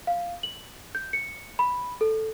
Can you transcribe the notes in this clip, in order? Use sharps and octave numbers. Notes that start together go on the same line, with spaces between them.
F5
F#7
G6
C#7
B5
A4